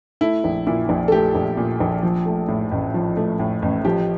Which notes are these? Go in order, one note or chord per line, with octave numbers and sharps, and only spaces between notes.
A3 E4
A#1
A#2 E4
A#1
A4
A3 G4
A#1
A#2
A#1
F3
A3
A2
A1
F3
A3
A2
A1
F3 G4